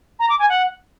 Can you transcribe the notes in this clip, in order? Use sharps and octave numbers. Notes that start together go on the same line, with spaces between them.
A#5
D6
G#5
F#5